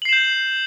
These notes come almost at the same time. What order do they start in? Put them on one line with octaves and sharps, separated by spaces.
F#7 C7 E7 G6